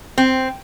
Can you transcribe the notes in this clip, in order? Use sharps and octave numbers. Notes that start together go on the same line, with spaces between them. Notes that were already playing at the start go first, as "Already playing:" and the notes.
C4